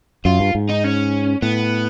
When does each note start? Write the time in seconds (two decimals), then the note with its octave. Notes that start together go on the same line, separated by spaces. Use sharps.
0.25 F#2 F4
0.40 G2
0.55 G#2
0.69 D#4
0.84 C#4
1.42 A2 B3